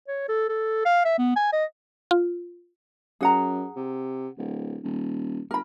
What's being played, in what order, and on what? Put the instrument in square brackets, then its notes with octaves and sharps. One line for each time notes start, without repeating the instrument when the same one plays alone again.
[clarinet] C#5
A4
A4
F5
E5
B3
G#5
D#5
[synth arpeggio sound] F4
[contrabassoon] F#2 [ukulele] G#4 F#5 A#5
[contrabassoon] C3
D1
D#1
[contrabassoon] G1 [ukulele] A#4 B5